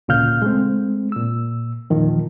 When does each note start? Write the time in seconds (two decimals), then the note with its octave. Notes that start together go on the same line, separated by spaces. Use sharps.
0.08 D2 A#2 C#3 F5 F6 G6
0.42 G#3 A3 C4
1.12 A#2 E6
1.90 E2 A#2 D#3 F3